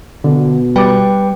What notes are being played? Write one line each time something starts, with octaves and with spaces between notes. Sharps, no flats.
B2 D3
G3 B4 G5 D6